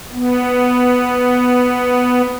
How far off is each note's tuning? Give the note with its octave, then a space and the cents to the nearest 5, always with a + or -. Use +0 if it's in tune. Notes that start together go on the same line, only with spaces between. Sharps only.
B3 +0